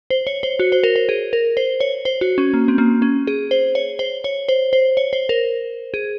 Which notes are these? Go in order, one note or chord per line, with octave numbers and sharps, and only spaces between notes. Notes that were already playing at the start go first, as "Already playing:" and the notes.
C5
C#5
C5
F#4
C5
A#4
C5
G#4
A#4
C5
C#5
C5
F#4
C#4
A#3
C4
A#3
C#4
G#4
C5
C#5
C5
C#5
C5
C5
C#5
C5
A#4
G#4